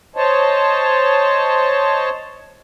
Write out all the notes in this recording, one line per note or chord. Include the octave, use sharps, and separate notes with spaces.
C5 C#5 D#5 A5